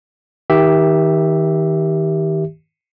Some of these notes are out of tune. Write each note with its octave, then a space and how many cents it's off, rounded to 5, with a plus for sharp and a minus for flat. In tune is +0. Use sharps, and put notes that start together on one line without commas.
D#3 +30 G4 +0 E5 +0